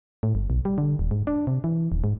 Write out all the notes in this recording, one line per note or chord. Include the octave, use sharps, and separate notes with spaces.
A2
G1
B1
G3
D3
D#1
G#2
D4
C3
E3
D#1
G#2